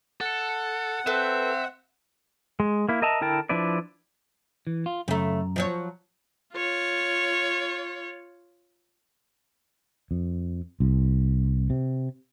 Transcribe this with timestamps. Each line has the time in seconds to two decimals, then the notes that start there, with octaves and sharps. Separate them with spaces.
0.21 A4 F#5
1.07 C4 A4 B4 C5 E5
2.60 G#3
2.89 A#3 E4
3.02 A#4 D#5 E5 A5 A#5
3.21 D3 E4 A#4 G5 A5
3.49 F3 D4 E4 B4 D5
4.67 E3
4.86 F4
5.08 F#2 C#3 A3 A#5
5.56 F3 F#3 C#5
6.53 F4 C#5
10.11 F2
10.80 C2
11.70 C3